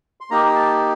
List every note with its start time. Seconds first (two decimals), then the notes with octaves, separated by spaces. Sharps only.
0.21 C6
0.30 A#3 D#4 G4 A#5
0.46 A#5
0.55 A5